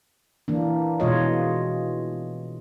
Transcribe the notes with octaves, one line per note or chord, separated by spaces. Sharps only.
E3 A#3 D4
B2 E3 G#3 F4 C#5 D#5